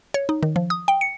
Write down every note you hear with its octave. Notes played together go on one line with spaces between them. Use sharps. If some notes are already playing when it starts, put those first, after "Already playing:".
C#5
D#4
D#3
F3
D#6
G5
C#7